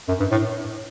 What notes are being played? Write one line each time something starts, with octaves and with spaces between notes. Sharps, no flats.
F#2
G2
A2